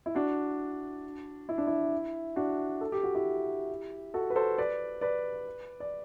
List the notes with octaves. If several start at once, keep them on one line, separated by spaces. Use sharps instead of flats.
E4
D4 F#4
E4
D4
E4
D4 F#4
A4
G4
F#4
E4 G4
F#4 A4
B4
A4 C5
B4 D5
B4 D5
D5